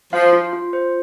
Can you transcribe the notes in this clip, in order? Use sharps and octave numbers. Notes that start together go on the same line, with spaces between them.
F3 F5
F4
F4
C5